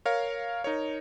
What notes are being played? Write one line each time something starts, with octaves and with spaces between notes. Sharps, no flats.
A#4 C#5 F5
D#4 A#4 C#5